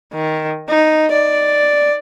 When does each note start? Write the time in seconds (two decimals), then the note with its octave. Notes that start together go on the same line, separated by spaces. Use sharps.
0.14 D#3
0.70 D#4
1.12 D5